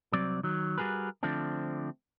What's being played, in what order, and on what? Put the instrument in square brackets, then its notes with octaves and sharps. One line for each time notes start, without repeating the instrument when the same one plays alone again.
[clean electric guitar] C2 F#3 C4 D5
D#3 F#3
G3 F#4 G#4 A#4 B4
D3 F3 A3 C4 D4